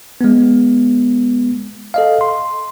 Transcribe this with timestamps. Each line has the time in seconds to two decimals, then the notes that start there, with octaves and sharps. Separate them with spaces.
0.21 G#3 B3
1.94 A4 D#5 F5
2.21 C6